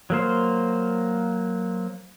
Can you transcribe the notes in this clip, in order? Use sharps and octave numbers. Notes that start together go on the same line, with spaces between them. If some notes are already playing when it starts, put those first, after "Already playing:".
F#3 A#3 C5